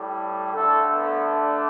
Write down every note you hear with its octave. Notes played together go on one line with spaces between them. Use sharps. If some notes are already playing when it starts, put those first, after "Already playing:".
Already playing: A2 G3
D3 A3 A4
B3
D4